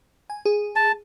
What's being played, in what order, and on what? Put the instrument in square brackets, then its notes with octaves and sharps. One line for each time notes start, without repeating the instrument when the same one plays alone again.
[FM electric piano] G#5
G#4
[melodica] A5